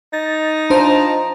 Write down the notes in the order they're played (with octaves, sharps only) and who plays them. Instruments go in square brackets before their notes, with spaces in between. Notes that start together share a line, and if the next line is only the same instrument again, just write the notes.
[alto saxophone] D#4 [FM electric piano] A6
[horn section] F3 A5 A#5 [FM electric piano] D4 C5